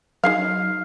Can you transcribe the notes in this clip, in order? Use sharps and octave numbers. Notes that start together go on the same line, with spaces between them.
F#3 D#4 G#4 F5 F6 C7